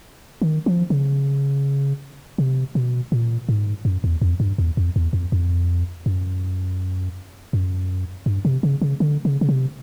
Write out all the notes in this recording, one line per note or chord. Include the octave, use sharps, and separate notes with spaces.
D#3
F3
C#3
C3
B2
A#2
G#2
F#2
E2
F2
G2
E2
F2
E2
F2
F2
F#2
F#2
G2
C3
C#3
C#3
D3
C#3
C#3
C3